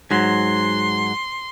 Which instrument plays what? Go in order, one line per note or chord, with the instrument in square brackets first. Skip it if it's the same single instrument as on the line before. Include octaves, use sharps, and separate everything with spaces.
[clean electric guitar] G#2 F#3 [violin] C6